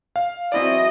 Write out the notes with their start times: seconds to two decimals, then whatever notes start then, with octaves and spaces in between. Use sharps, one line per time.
0.16 F5
0.52 E3 F#3 C4 E4 G#4 D5 D#5